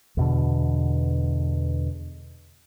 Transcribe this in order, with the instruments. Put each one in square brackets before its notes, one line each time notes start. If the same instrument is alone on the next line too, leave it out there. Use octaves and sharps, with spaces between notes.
[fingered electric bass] E2 B2 D3